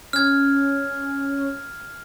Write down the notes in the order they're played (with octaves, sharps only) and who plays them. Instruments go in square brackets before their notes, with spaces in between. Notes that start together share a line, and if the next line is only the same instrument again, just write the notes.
[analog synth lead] C#4 [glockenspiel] F6 G#6